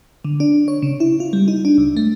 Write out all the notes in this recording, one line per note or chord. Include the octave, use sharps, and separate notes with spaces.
D3
D4
C#5
C#3
E4
F4
G3
D#4
D4
C#2
A3